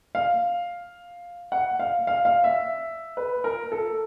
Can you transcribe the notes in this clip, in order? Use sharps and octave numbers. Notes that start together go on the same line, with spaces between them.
F5
F#5
F5
F5
F5
E5
B4
A#4
A4